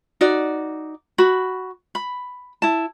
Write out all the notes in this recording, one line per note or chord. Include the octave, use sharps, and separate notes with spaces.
D#4 F#4 D5
F#4 B5
B5
E4 A5